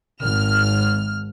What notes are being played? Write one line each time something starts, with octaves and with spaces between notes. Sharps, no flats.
G#1 F6